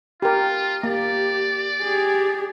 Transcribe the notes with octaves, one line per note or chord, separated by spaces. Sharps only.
F4 G4 A#4
A#3 G4 D5
G4 G#4